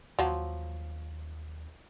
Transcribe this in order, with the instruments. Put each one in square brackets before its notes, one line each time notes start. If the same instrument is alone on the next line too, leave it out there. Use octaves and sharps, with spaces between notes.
[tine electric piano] D#2 [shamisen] F3 F#3